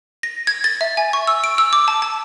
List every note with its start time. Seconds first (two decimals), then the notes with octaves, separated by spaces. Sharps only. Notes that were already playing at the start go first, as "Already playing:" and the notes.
0.23 A#6
0.47 G#6
0.64 A6
0.81 E5
0.97 G#5
1.13 C#6
1.27 E6
1.44 D7
1.58 E6
1.73 D6
1.88 A5
2.02 A5